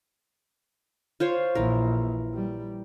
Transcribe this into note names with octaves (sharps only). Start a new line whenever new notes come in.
F4 C5 C#5
A#1 E3 A#4
G3